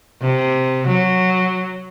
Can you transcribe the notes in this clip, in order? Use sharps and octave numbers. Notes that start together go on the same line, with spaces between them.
C3
F#3